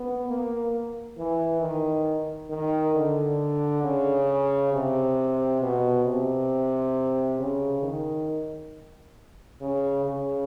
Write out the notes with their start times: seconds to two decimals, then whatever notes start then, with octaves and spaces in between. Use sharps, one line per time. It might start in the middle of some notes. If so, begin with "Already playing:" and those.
Already playing: B3
0.29 A#3
1.18 E3
1.61 D#3
2.50 D#3
2.95 D3
3.84 C#3
4.73 C3
5.61 B2
6.05 C3
7.39 C#3
7.83 D#3
9.61 C#3
10.05 C#3